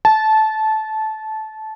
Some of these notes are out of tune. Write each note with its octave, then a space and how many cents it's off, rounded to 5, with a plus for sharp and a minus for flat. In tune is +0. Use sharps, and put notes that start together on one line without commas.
A5 -15